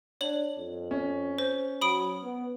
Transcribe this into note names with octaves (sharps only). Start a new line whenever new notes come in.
D4 C#5 F#7
F2
C#4
C5
F#3 B5 D#6 D7
B3